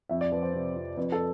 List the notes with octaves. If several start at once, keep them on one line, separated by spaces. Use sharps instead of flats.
F2 E5
D5
F3 B4
C5
C3
F2
F2 B4
A4